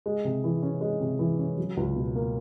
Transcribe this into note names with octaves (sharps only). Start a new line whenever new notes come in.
G#3
C3
E3
C#4
G#3
C3
E3
C#4
F#3
C#2
B2
A#3